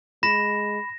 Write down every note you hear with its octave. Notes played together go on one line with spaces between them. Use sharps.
G#3 B5 A#6 E7